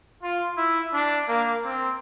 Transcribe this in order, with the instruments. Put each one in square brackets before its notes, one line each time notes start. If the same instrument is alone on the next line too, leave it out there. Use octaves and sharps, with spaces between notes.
[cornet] F4
E4
D4
A#3
C4